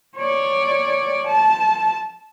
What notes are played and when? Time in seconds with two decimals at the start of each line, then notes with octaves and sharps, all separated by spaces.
0.17 C#5 D5
1.27 A5